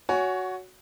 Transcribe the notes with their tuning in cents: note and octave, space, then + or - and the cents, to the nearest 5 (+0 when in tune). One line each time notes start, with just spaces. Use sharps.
F#4 +0 C#5 +20 G#5 +0